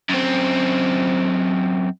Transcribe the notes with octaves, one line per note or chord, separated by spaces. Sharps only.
F#2 C4